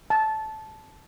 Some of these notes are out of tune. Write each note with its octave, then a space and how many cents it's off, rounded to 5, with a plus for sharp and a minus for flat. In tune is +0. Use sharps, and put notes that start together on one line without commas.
A5 -15